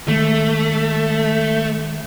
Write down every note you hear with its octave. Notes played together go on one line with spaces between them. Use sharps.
D#3 G#3 A3